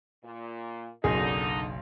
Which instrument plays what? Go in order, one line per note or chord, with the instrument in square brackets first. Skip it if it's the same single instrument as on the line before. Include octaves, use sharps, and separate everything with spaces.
[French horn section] A#2
[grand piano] F#1 B1 [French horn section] D3 D#4 [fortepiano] G#4